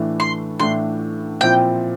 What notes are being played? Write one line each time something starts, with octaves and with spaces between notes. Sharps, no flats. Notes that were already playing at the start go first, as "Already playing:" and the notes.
Already playing: A2 E3 A3 D4
C6
A2 E3 A3 D4 C6
A#2 F3 C4 E4 G5